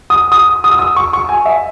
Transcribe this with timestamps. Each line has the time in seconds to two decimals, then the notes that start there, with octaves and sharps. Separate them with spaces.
0.10 D#6
0.32 D#6
0.64 D#6
0.71 E6
0.79 D#6
0.96 C#6
1.13 C#6
1.29 G#5
1.46 E5